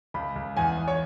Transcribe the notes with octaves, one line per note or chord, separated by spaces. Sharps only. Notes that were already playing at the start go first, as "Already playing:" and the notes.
C#2 B5
C#2
E2 G#5
E2
C#5